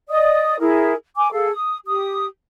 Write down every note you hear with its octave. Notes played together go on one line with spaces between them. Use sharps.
D5 D#5 D#6
E4 G#4 A#4
G#5 D6
G#4 A4 F5
D#6
G4 D#6